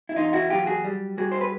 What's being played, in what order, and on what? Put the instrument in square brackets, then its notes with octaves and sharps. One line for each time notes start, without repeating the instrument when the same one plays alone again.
[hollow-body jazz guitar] E4
E2 D#4 F4
E4 F#4
F#3 F4 G4
F#4 G#4
G3
G3 F#4 G#4
C5
B4